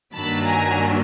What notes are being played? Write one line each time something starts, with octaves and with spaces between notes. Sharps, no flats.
G2 D#3 F#3 A#3 D4 A5 B5
G#5 A#5